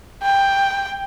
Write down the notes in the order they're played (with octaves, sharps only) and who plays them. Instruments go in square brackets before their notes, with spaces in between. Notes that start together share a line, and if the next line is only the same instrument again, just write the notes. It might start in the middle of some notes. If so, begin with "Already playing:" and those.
[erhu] G5